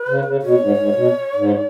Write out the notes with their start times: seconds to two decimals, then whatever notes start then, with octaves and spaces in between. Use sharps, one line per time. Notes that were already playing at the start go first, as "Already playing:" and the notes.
Already playing: B4
0.08 C#3
0.25 C#3
0.43 B2 C#5
0.60 G#2
0.78 G#2
0.96 B2
1.36 G#2